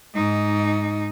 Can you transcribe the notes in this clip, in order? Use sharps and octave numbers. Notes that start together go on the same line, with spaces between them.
G#2 D#4